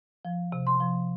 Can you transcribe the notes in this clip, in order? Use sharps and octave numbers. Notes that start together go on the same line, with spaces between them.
F3
C3
C6
F3